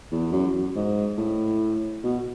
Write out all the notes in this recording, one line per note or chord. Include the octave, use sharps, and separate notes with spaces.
E2
F#2
F#2
G#2
A2
B2